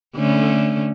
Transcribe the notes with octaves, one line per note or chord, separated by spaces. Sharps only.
D3 A3 C#4